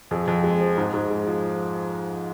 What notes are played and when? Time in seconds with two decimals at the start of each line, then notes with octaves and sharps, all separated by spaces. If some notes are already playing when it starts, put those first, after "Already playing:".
0.11 F2 G#4
0.27 F2
0.44 G#3
0.60 F3
0.78 G#2
0.94 G#2
1.10 G#3
1.27 F3